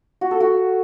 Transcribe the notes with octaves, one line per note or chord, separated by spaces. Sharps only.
F#4
A4
F#4